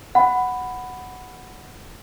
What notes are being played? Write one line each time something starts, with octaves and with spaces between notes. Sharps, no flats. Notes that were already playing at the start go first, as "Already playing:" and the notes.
F#5 B5